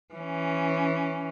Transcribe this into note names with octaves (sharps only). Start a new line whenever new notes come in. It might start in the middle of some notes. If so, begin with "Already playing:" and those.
E3 C#4